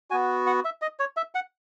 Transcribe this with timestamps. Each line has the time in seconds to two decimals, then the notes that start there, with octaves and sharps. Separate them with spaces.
0.11 B3 F#4 G#5
0.46 F#5
0.65 E5
0.82 D#5
1.00 C#5
1.17 E5
1.35 F#5